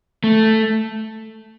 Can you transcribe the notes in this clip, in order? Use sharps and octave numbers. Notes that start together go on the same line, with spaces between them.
A3